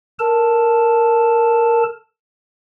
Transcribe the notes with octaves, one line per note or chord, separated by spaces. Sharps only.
A4 A#4 A5